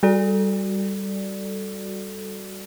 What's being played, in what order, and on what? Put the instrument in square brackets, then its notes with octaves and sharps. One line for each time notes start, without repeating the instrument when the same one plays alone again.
[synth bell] G3 F#4 A4 D5